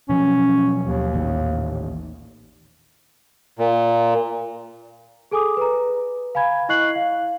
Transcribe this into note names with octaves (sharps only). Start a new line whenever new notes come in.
B2 F3 F#3 C#4
D#2
A1 A#2 D#3
A#2
G#4 A4 G#5 D6 D#6
B4 A#5
F5 G#5 B5 G#6
E4 D#5 C#6 F#6 C7 F#7
F5